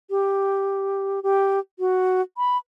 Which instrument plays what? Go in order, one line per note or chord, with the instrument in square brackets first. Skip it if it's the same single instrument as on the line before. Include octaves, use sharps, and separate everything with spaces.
[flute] G4
G4
F#4
B5